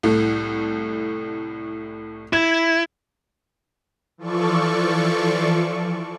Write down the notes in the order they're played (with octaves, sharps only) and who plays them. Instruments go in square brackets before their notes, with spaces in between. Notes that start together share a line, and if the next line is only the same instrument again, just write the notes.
[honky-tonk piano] C2 A2 A3
[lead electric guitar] E4 [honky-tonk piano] G#6
[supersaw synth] E3 F3 F4 A4 D5 C#6